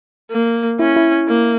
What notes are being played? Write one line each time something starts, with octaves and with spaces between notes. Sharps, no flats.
A#3
C#4 E4
E4
A#3